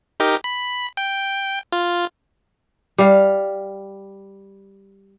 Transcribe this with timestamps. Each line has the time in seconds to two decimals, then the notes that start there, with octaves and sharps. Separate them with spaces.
0.20 D#4 G4 A#4
0.44 B5
0.97 G5
1.72 F4
2.98 G3 F5